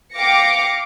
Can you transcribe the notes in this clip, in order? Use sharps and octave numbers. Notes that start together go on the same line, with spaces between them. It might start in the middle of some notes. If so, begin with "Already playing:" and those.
F5 G5 D6 A#6 C#7